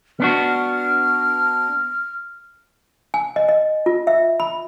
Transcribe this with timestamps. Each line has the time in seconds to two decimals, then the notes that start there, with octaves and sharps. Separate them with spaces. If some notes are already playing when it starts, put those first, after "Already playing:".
0.20 B3 D4 F#4 F6
3.14 G#5
3.36 D#5
3.49 D#5
3.86 F4
4.07 E5
4.40 B5